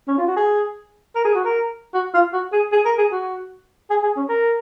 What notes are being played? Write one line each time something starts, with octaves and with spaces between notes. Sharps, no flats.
C#4
F4
F#4
G#4
A#4
G#4
F#4
A#4
F#4
F4
F#4
G#4
G#4
A#4
G#4
F#4
G#4
G#4
C#4
A#4